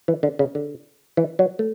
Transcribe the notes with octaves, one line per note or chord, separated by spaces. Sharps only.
E3
D3
C#3
D3
E3
F#3
A3